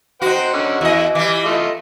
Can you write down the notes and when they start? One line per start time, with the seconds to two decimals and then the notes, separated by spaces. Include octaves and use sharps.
0.22 D#4 F#4 C5 F#5 G5
0.53 D3 C#4 F#5
0.81 E2 E4 F#4 D#5
1.15 E3 G3 G#5 D6
1.45 A3 F4 D#5